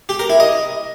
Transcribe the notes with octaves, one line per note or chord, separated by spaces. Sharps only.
G4
A#4
E4
D#5